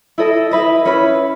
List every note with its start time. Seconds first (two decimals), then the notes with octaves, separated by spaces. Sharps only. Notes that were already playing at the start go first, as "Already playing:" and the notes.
0.18 E4 A4 D#5
0.51 E4 B4 D#5
0.85 C#4 E4 B4